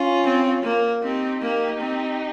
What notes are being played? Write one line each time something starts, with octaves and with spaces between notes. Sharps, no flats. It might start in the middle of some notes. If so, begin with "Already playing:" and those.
Already playing: C#4 F4
C4
A#3
C4 D#4 G4
A#3 D#4 G4
C4